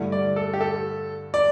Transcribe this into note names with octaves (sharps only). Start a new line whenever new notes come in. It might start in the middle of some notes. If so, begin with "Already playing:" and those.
Already playing: G2 D3 A3 E4
D5
A4
G4
A4
D5